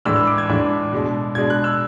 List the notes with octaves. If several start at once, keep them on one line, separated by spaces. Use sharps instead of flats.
A2 E3 G#3 D4 E6
E6
D6
G#6
A2 E3 G#3 D4
B2 G#3 D4
B2 G#3 D4 G#6
F#6
E6